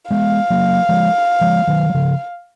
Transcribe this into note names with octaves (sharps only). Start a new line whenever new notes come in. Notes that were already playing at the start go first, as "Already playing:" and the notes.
G#3 B3 F5
F#3 A#3
F3 G#3
F3 G#3
D#3 F#3
F#3
C#3 F3